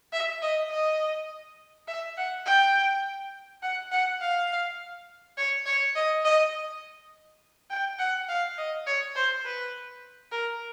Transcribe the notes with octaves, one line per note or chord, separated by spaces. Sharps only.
E5
D#5
D#5
E5
F#5
G5
F#5
F#5
F5
C#5
C#5
D#5
D#5
G5
F#5
F5
D#5
C#5
C5
B4
A#4